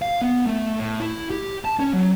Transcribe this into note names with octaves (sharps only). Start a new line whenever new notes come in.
F5
B3
A3
A2
E4
G4
A5
C#4
F#3